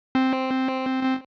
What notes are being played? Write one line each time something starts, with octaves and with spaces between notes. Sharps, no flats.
C4
C4